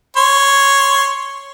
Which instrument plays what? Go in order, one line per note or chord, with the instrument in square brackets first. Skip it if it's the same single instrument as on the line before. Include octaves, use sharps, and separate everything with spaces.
[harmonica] C#5 C6